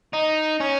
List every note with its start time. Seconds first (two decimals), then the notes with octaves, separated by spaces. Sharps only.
0.14 D#4
0.61 C#4